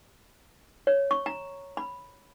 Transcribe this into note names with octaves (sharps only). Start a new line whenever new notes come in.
C#5
C#6
A#5
B5